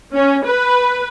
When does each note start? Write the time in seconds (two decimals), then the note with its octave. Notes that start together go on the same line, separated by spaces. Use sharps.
0.14 C#4
0.46 B4